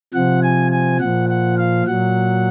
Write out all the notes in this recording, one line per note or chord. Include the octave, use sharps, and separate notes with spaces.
C3 F3 F#5
G#5
G#5
A#2 F3 F#5
F#5
F5
A#2 F#3 F#5